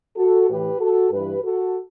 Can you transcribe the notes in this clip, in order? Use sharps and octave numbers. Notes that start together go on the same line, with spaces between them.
F#4 A4
A2 E3 G4 B4
F#4 A4
G2 E3 G4 B4
F#4 A4